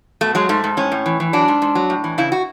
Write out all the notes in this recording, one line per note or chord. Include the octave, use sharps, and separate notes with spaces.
B2 A3
F#3 G#3
G#2 A3
G#2
A2 C#4
A2
E3
E3
F#3 D4
G#2
G#2
F#3
A2
E3
C#3 E4
F#4